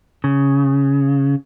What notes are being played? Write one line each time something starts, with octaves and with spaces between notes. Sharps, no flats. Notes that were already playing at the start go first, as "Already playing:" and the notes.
C#3